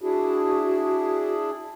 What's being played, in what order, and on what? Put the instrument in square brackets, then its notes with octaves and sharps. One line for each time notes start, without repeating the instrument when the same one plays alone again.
[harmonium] D4 E4 G#4 [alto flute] F#4